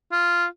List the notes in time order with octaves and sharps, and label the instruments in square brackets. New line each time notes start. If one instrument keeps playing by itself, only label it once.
[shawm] F4